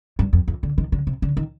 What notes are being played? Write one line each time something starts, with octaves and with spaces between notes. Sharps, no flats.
G2
F2
F2
D3
D#3
D3
C3
D3
D#3